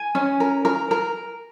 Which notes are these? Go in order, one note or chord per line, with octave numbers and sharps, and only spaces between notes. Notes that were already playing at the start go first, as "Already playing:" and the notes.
Already playing: G#5
C#4
A#4
A#4
A#4